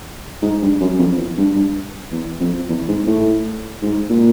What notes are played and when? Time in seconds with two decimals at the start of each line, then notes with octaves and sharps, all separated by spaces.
0.42 G#2
0.62 G2
0.81 F#2
0.99 F2
1.18 E2
1.38 G2
1.55 G2
2.12 E2
2.40 F2
2.69 E2
2.88 G#2
3.07 A2
3.82 G#2
4.10 A#2